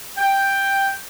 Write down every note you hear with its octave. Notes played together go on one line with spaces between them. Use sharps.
G5